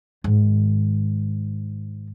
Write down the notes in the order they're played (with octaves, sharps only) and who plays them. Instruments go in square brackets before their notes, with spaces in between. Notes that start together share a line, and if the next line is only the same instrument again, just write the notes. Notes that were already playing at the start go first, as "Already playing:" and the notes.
[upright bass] G#2 D#3